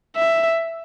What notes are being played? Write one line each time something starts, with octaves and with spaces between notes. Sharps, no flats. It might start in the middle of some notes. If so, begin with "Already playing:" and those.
E5